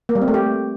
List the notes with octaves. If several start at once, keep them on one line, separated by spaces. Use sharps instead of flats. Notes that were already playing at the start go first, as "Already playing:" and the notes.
A#3
G3
C4
A3
G4